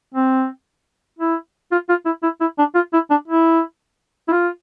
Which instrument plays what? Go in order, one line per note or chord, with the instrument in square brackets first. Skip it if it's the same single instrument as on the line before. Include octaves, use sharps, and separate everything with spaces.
[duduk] C4
E4
F4
F4
E4
E4
E4
D4
F4
E4
D4
E4
E4
F4